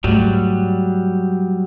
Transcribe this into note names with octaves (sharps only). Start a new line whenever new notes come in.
G#2 F#3 G3 A3